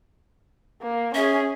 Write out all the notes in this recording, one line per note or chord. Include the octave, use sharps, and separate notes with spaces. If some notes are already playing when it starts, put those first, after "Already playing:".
A#3
C#4 G#4 E5